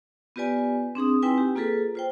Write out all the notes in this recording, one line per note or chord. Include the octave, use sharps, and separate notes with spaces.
B3 F4 G4 B4 D5 G#5
C4 D4 G#4 D#6
C4 D#4 E4 B4 G5 G#5
G4
A#3 F4 G#4 A4 B4
F4 C5 G5